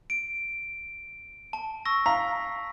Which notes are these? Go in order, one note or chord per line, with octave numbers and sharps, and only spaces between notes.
D7
A5
C#6 E6 A#6
F5 A#5 B6